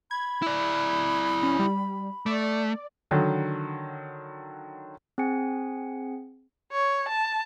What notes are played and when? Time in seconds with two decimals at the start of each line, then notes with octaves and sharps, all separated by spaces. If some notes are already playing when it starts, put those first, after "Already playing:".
0.11 B5 G#6
0.42 E4 D5
1.43 C#4
1.59 G3
2.26 A3 D5
3.11 D3 D#3 F#3
5.18 C4 G#4 F#5 G#5 C#7
6.72 C#5
7.09 A5